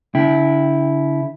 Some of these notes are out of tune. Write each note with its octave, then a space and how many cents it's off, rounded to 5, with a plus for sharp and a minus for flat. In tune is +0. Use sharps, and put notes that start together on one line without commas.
D3 -45 E4 -5 G5 +0